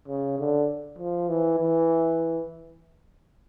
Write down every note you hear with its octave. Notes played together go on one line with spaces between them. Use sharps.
C#3
D3
F3
E3
E3